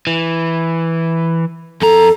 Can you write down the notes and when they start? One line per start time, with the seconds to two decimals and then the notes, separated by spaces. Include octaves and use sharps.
0.07 E3
1.82 F2 A4 A#5